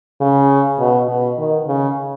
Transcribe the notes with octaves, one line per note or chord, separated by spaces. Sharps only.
C#3
B2
B2
D#3
C#3